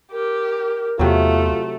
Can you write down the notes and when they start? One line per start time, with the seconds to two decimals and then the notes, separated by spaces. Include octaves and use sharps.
0.12 G4 A#4
0.99 E2 C3 F#3 A3 F4